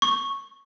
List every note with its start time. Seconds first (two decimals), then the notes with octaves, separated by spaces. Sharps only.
0.02 C#6